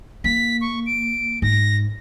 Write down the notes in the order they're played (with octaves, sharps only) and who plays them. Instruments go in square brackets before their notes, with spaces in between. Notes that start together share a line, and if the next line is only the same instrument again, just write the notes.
[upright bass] A#3 [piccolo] B6
[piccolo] C#6
D7
[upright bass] G#2 [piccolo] A#6